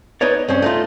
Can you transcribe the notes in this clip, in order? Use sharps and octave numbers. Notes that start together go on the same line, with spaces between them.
D#4 B4 C#5 D5
G2 C4 C#4
A3 D#4 F4